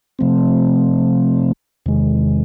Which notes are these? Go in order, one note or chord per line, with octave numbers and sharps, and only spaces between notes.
C3 F3 A3 C4
E2 C3 D#3 G#3